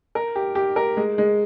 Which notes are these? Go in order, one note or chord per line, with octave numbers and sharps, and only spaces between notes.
A#4
G4
G4
A#4
G#3
G#3